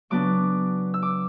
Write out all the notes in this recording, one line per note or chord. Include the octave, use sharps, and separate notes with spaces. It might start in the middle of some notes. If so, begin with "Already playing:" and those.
C#3 F#3 B3 D4 D6
E6
D6